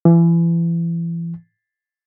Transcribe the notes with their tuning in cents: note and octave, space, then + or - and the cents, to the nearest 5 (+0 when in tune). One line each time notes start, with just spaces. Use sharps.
E3 +30